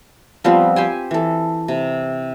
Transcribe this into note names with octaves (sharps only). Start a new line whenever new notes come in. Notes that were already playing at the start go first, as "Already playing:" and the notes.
F3 G3 B3 C4
G4 C5 G#5
E3 A4
C3